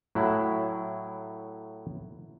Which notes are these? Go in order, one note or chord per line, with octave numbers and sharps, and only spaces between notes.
A2 F#3 E4